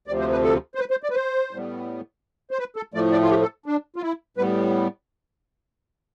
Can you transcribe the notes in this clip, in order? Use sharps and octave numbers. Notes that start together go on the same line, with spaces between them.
D2 C3 F3 D5
C5
B4
A4
C5
B4
C5
D5
B4
C5
A2 G3 B3
C5
B4
A4
A2 F3 A3 D5
D5
F4
G4
A4
D4
F4
E4
A2 G3 B3 B4